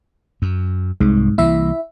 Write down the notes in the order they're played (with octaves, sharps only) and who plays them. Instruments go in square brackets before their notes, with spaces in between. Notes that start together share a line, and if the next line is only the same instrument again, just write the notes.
[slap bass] F#2
[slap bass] C2 [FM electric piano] G#2
[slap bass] C2 E3 A#3 [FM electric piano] E4 E5